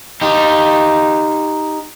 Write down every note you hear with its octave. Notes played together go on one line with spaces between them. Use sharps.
D#4 G4